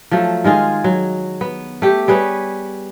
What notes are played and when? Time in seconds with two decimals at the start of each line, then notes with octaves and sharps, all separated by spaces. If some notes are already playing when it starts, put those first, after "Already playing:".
0.11 F3 F#3 A3
0.44 D#3 G#3 F4 G#4
0.84 F#3
1.41 B3
1.82 A3 G4
2.08 G3 G#4 B4 C#5